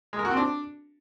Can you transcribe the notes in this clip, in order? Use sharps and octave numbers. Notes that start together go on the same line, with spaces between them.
G#3
A#4
F#4
C4
D4